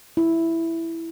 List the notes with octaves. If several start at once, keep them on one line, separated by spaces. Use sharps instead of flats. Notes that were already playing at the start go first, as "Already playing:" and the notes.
E4